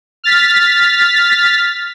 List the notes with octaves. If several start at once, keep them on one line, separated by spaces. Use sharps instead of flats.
F6 A6 B6